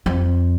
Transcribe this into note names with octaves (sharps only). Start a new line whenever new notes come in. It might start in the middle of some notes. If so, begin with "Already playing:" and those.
F2